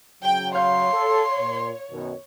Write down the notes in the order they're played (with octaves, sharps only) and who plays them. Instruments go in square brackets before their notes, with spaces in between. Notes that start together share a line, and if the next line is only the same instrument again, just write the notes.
[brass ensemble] C#3 F#3 [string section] G5
[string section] C#5 [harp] F5 G6 [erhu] C6
[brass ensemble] A4
A#2
F#2 B2 D#3